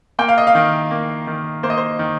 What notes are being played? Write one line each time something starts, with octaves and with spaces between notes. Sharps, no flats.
A#3 G5
F5
D#5
F5
D#3
A#3
D#3
A#3 C5
D#5
C5
D#3